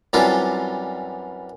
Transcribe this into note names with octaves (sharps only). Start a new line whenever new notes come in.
F#2 E3 G3 C4 D4 F4